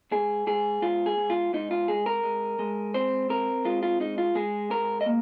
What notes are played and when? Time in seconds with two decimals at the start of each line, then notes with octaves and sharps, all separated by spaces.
0.11 G#2 G#4
0.47 G#2 G#4
0.82 G#2 F4
1.06 G#4
1.18 G#2
1.30 F4
1.53 G#2 D#4
1.71 F4
1.88 G#3 G#4
2.06 A#4
2.23 G#3
2.59 G#3
2.94 C4 C5
3.29 C4 A#4
3.65 G#3 F4
3.83 F4
4.00 G#3 D#4
4.18 F4
4.35 G#3 G#4
4.70 G#2 A#4
5.01 D#5
5.06 A#3